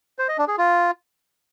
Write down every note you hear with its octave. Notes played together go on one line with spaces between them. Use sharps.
C5
D#5
D4
G#4
F4